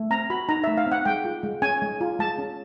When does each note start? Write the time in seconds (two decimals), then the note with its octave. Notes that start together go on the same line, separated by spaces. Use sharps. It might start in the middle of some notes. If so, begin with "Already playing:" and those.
Already playing: A3
0.10 C4 A#5
0.30 F#4 B5
0.49 D#4 A#5
0.64 E5
0.67 A3
0.77 F5
0.86 C4
0.92 F#5
1.05 G#3 G5
1.25 F4
1.43 G#3
1.62 C#4 G#5
1.82 G#3
2.01 F4
2.19 G#3 A5
2.39 C#4